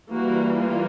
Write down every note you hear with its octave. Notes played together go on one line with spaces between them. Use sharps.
E3 G3 A#3 F#4
F4